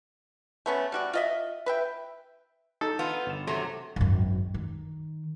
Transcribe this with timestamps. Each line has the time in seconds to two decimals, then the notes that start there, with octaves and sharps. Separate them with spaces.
0.66 A3 B3 C#4
0.92 G3 F#4 D5
1.13 F4 D#5 E5
1.66 B4 E5 G5
2.81 D#4 A4
2.99 B3 F4
3.26 G1 E7
3.47 C3 F#3 A3 A#6
3.96 G#1 F#2
4.54 D#3